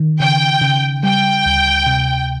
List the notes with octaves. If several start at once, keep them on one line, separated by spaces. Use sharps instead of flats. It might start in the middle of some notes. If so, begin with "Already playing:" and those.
Already playing: D#3
C#3 G5
C#3
G3 G5
D2
C3